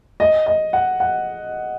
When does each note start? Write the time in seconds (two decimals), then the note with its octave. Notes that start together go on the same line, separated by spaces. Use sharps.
0.20 D#5
0.46 D#5
0.73 F#5
1.00 F#5